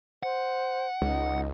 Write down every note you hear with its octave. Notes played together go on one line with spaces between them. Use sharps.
C5 F#5
C#2 D#4